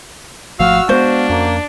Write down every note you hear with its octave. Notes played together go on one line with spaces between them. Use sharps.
G#1 F3 A3 F#4 F5 E6 F6
G#3 B3 D4 F#4 C5 F5
F2 A#3 C#4